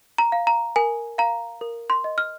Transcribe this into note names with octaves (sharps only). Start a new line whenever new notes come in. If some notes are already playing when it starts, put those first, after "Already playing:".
A#5
F5
A#5
A#4 G#5
F5 A#5
A#4
C6
D#5
F6